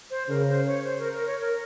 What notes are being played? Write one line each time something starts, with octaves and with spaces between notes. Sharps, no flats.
C5
C#3 A#4
C5
C#5
C5
A#4
A#4
C#5
A#4